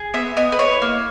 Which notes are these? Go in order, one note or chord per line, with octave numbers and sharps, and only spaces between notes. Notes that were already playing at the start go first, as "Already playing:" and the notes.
Already playing: G#4
B3 E5
B3 D#5
B4
E4 C#5
A#3